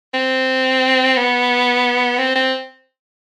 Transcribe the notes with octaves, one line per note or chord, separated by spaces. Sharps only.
C4
B3
C4
C4